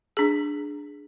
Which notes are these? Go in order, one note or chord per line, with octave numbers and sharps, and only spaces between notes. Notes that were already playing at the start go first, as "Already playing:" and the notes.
D4 G#4